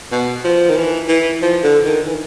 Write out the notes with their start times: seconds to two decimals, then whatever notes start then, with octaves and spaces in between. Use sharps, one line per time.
0.12 B2
0.45 F3
0.70 D#3
0.76 E3
1.09 E3
1.42 F3
1.63 D3
1.85 D#3
2.07 E3